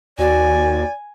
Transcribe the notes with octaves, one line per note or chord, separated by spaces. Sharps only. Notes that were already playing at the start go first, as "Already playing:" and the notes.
D#2 F#4 D5 G#5